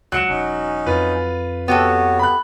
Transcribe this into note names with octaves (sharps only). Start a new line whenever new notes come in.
C#2 F#3 F#6 C#7 E7
E1 C#4 D#4
F2 F4 B4
B3 F#4 G4 A4 C#5
B5 F#6